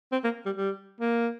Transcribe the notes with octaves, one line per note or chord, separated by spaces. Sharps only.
C4
A#3
G3
G3
A#3